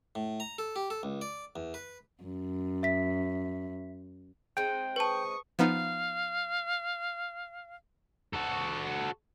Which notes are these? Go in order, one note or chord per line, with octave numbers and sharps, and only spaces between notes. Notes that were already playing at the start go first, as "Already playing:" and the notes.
A2
A#5
A4
G4
A4
C#2
D5
E2
B4
F#2
E5 B6
G#3 C4 D#4 G5
B4 A5 C#6 D#6
F3 B3 D#4 F5
F#4 A4